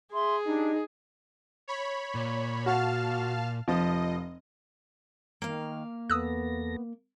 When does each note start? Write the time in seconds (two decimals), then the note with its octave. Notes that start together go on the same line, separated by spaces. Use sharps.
0.14 G#4 E5 C6
0.45 D4 D#4 G4
1.68 C#5 B5
2.15 A#2
2.66 F#4 F5 A5 F6
3.68 F1 F3 D#5
5.42 D#3 A#3 F5
6.10 E2 B3 A4 D#6 E6 F#6 A#6